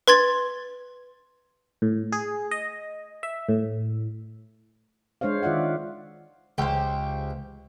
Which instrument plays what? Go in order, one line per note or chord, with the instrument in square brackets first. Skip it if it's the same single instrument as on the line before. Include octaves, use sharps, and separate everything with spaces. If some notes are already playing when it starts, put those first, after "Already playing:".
[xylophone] B4 C6 G#6 A6
[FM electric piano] A2
G#4
D#5
E5
A2
[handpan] G#3 D4 C5 C#5 F5
D#3 F4 D5 E5 F#5
[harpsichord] C#2 [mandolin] G4 C5